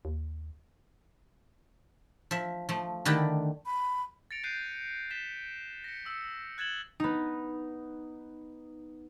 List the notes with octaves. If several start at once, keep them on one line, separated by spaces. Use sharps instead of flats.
D#2
F3 E5
F3 A3
D3 D#3 A3 D4 E4 G4
B5
A6 A#6 C#7 D7 F7
F#6 G6 A#6 C7 D7 D#7
A6 B6 E7 G7
A#6 C#7
D#6 E6 C#7
F#6 G#6 A6 E7 F#7 G7
B3 D#4